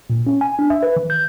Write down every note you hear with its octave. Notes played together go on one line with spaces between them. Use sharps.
A#2
C#4
G#5
D4
E5
B4
D#3
G6